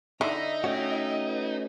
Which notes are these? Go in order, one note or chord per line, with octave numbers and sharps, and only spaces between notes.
D3 D#4 E4 D#5 E5 A#5
A3 C#4 F#4 D#5 E5 G5
B4